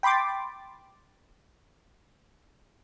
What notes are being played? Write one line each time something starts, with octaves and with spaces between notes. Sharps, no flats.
G5 B5 C6 D6 A6